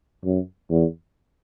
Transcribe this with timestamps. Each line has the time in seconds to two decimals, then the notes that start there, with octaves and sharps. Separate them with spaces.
0.25 F#2
0.70 E2